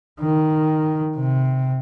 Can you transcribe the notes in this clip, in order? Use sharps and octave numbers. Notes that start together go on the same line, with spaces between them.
D#3
C3